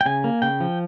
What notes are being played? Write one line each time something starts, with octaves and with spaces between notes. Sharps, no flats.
G5
C#3 G#5
A#3
C#3 G5
F3